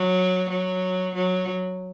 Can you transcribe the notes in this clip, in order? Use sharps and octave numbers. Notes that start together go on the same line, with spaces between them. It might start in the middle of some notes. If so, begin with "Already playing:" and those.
Already playing: F#3
F#3
F#3